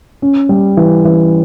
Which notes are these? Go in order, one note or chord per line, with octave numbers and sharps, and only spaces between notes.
C#4
G3
E3
E3